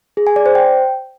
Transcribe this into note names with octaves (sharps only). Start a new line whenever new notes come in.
G#4
G#5
D5
C5
G5